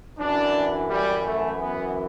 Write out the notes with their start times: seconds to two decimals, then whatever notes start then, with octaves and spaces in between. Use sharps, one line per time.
0.19 F#2 E3 D4
0.90 G3
1.26 A3
1.61 B3